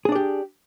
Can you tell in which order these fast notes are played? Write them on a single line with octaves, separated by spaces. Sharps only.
G#4 D4 D5 G4